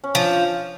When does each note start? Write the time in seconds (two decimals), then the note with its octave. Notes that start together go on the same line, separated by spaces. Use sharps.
0.04 C#4
0.15 F3 D4